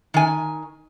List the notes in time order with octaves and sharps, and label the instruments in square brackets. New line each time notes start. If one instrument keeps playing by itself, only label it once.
[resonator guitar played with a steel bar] D#3 G#5